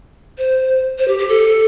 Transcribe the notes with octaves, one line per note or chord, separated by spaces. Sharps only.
C5
C5
G4
G4
A4